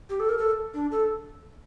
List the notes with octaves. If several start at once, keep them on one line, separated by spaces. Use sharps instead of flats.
G4
A4
A#4
A4
D4
A4